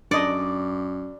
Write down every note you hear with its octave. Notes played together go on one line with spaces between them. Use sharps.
F#2 D4 D5 D#5